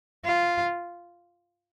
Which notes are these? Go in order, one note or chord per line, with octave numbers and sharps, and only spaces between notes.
F4